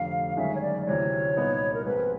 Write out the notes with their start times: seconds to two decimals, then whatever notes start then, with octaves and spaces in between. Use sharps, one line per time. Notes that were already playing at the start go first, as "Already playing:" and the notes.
Already playing: F1 F2 D3 F5
0.37 G1 F#2 D#3 G#3 C#4 E5
0.55 C#5
0.61 D5
0.86 D2 C3 E3 C#5
1.37 C2 A#2 G3 B3 D#4
1.74 A#4
1.85 A#1 G#2 F3 G#3 C4 B4